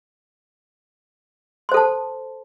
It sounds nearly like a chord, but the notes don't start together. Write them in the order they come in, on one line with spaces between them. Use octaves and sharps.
C6 C5 A4 A5